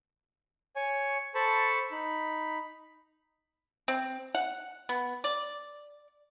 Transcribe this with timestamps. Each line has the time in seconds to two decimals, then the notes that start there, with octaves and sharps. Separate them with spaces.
0.76 C#5 G#5 C#6
1.35 A4 C5 A5 B5 C#6
1.91 D#4 B5
3.88 C4
4.35 F#5
4.89 B3
5.24 D5